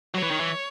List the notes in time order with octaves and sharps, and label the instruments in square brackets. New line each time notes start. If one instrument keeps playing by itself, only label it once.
[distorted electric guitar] F#3 [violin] C#5
[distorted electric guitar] E3
D#3
E3